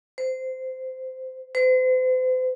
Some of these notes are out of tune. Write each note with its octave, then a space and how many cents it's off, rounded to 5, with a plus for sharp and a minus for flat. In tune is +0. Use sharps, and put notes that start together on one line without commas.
C5 -15
C5 -40